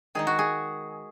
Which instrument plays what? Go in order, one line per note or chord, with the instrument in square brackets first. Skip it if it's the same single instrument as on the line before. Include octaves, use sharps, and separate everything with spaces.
[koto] D#3 G#3 D#4 G#4
F#4
G#4